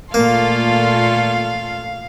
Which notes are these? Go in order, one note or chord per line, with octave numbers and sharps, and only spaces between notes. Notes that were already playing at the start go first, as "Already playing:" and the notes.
A#2 A3 A#3 F4 A4 F5 C6